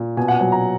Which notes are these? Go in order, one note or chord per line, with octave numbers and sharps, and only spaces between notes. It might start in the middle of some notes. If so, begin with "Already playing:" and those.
Already playing: A#2
B2 G#5
F#5
F#3 G#5
A#5